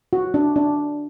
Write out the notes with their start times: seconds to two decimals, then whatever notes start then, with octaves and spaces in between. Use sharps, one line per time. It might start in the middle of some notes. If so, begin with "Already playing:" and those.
0.13 F#4
0.34 D4
0.56 D4